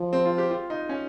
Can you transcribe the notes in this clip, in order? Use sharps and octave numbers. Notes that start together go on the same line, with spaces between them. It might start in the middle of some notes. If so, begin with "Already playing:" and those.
Already playing: F3
C4
F4
G4
F4
D#4
C#4